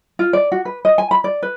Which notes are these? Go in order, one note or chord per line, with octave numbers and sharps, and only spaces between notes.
F4
D5
F#4
B4
D#5
G#5
B5
D5
B4